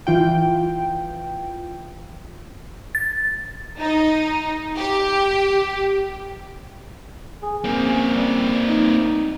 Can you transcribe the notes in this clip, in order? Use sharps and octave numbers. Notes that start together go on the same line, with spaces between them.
E3 F4 G5
A6
D#4
G4
G#4
A#3 C4 G#4
C#4
G3
D#4